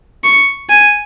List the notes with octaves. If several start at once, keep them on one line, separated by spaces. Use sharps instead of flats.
C#6
G#5